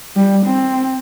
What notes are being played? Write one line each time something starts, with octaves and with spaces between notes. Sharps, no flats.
G3
C4